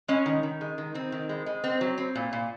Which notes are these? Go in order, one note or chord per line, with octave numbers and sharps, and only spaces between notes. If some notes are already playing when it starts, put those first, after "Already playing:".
G#3 C#4
D#3
D#3
G#3
D#3
D#3 C4
D#3
G#3
G#3
C4
F#3
C4
A#2
A#2